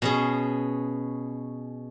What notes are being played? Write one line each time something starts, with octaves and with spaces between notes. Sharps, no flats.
B2 C#4 G#4